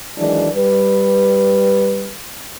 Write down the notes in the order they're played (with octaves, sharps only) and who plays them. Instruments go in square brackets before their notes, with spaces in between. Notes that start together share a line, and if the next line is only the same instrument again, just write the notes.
[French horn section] D#3 E3 F#3 G#3 D4
G3 B4